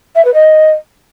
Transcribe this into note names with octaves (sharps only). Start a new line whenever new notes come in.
E5
B4
D#5